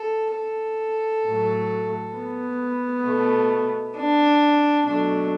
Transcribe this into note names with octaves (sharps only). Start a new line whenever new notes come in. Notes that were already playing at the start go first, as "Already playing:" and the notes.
Already playing: A4
A4
A2 F#3 A3
B3
B2 A3
D4
B2 F#3 A3 D4